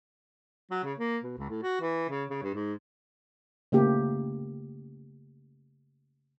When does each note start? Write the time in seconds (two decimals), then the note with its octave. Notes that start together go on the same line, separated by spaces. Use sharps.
0.70 F#3
0.84 C#3
0.98 A#3
1.24 B2
1.38 C#2
1.50 A2
1.62 F#4
1.81 E3
2.09 C#3
2.30 C#3
2.43 G2
2.54 G#2
3.72 C#3 A3 A#3 G4